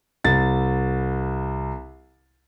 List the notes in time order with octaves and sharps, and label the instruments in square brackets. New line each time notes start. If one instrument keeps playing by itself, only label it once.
[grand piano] C2 A6